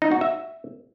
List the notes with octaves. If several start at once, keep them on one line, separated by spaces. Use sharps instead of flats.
D#4
F#4
E5